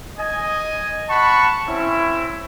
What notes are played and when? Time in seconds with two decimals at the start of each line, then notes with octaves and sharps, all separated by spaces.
0.18 D#5 G#5
1.10 F#5 A5 B5 C#6
1.68 C4 C#4 E4